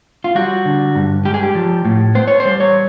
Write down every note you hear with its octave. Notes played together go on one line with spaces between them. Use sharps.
F4
G3 F#4
D3
G2
G#3 G4
G#4
G4
F3
A2
B3 C5
C#5
C5
G3
C#5